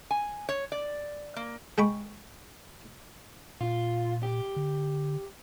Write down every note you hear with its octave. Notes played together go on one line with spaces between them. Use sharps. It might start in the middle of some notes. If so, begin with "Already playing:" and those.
G#5
C#5
D5
A#3
G#3 G5 B5 C#6
A#2 F4
G4
D3